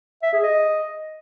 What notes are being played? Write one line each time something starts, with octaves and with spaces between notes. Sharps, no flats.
E5
G#4
D#5